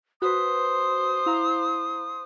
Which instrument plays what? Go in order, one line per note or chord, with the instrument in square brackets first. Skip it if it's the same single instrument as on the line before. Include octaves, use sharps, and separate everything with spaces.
[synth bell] F#4 B4 [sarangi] C5 [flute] D#6
[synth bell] E4 F5 A#5